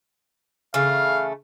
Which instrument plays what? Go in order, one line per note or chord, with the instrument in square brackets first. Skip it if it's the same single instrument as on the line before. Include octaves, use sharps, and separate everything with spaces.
[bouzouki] C#3 E3 A3 [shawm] F5